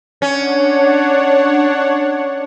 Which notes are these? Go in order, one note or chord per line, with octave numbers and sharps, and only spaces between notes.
C#4 D4 C#5 F#5